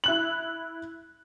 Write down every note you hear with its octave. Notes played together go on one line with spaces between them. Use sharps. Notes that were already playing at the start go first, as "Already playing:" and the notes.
E4 F#6 F#7